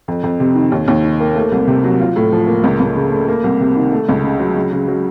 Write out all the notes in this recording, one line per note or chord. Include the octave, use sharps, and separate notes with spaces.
F2
F2
C3
D#3
D#2
D#2
D#3
A#3
A3
C2
C3
F#3
F4
A2
F3
A#3
C#2
C#2
C#3
A3
A#3
C2
C3
D#3
A3
C#2
C#3
F#3
C#3
C#3
F#3